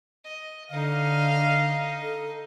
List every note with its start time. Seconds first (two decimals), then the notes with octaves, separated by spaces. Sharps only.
0.25 D#5
0.71 D3 D#4 D#5 F5
2.02 A4